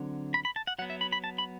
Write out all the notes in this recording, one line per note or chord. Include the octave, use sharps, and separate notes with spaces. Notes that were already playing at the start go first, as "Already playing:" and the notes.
Already playing: D3 F#3 C4
B5
B5
A5
F#5
F#3 B3 F#5
E5
B5
B5
A5
B5